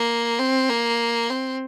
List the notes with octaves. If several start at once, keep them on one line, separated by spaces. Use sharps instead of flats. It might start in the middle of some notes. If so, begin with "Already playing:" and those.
Already playing: A#3
C4
A#3
C4